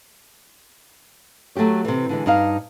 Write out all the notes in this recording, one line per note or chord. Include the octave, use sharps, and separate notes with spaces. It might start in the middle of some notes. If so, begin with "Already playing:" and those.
F#3 A3 F#4 G4 C#5
C3 E3
D3 E3 G#3
G2 D#4 F5